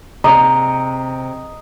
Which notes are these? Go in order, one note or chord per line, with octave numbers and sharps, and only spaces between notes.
C3 D#5 A#5